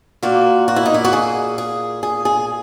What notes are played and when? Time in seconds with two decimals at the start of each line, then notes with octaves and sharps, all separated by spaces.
0.23 A#2 A#3 F#4
0.68 F#4
0.76 E4
0.86 D#4
0.94 E4
1.05 F#4
1.13 G#4
1.58 G#4
2.03 G#4
2.25 G#4